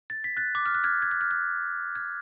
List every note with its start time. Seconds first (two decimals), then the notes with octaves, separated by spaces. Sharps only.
0.10 A6
0.24 B6
0.37 F#6 A6
0.55 D6
0.66 F6
0.75 F#6
0.84 F6 G#6
1.02 G#6
1.11 F#6
1.21 F6
1.31 F#6
1.95 F6 G#6